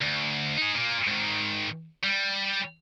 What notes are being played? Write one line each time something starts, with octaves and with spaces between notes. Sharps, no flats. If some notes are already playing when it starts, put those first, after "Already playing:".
D2
D#4 G#4
A#2 A#3
G#2 D#3
G3